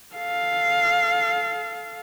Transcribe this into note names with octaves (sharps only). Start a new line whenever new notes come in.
A4 F5